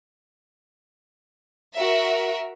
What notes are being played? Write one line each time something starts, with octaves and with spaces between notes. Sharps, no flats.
F#4 A#4 E5